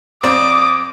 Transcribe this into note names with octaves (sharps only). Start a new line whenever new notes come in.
F2 C4 D5 D6 D#6